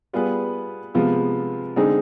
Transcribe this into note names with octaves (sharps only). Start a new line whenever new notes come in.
G3 B3 F4 G#4 B4
C3 F3 G#3 B3 F4
D3 G#3 C4 D#4 G#4